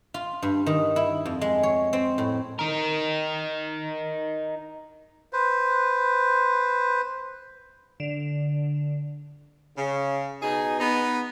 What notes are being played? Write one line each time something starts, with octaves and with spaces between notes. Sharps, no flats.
F4
G2
D#3
E4
F2
G#3
C#5
C4
A2
D#4 A#4
B4 C5
D3
C#3
B2 D#4 G#4
B3 D#4